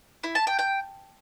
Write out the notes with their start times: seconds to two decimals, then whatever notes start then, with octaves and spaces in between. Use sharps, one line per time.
0.24 E4
0.35 A5
0.47 G5
0.59 G5